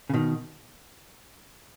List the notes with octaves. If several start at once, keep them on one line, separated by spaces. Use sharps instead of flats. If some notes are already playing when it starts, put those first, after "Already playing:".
C#3
B2 D#3